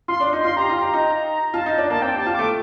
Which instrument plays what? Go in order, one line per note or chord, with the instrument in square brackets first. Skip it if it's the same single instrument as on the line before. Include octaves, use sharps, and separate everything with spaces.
[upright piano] F4 [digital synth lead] C6
[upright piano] D4
D#4
[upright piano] F4 [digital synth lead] C6
[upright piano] G4 [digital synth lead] A#5
[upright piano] F4
G4
D#4
[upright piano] F4 [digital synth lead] A5
[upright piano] D#4
D4
[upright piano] A#3 [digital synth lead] A5
[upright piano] C4 [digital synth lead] G5
[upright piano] G4
[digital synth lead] A5
[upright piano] F4
[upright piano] A3 [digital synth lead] D6